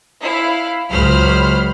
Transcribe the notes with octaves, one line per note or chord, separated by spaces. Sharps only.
E4 F5
C#2 F#3 C5 B5 F6